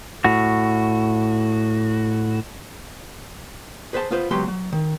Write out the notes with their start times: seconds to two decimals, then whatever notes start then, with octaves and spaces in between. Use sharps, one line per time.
0.24 A2 F#4
3.93 G#4 B4 C5 F5 A5
4.11 B3 F4 B4 C5
4.31 C#2 F#3 B3 G4 C6
4.48 F#3
4.72 D#3